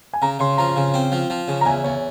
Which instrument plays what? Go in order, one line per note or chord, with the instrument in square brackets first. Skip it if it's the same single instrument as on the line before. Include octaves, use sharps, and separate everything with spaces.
[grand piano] G#5
[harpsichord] C#3 [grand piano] A#5
[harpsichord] C#3 [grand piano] C6
[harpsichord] F3 [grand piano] A#5
[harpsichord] C#3
C4
F3
F3
C#3
[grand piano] A#5
[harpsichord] E2 [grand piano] G#5
[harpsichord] E2 [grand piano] C#5